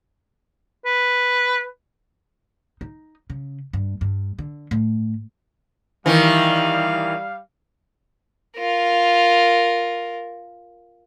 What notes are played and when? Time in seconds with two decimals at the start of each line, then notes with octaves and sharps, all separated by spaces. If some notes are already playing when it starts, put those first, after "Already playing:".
0.86 B4
2.81 D#4
3.30 C#3
3.73 G2
4.01 G2
4.39 D3
4.71 A2
6.06 D#3 E3 G3 F5
8.58 F4 A#4